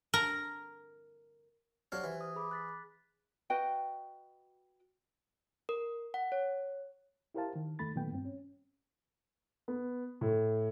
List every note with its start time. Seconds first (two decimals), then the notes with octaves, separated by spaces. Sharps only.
0.14 A#4
1.92 F#3 D4 F#4 G4 C5 F5
2.04 E3
2.21 D#6
2.36 G#4 B5 D6
2.51 F#6 A6 B6
3.50 F#4 B4 D#5 G5
5.69 A#4
6.14 F#5
6.32 C#5
7.34 E4 G4 A#4 C5 F5 A5
7.56 D#3
7.79 E2 D#3 A3 B5 A6
7.96 A#2 D#3 F#3 A3 B3 G5
8.12 G2 C4
8.25 C#4
9.68 B3
10.21 A2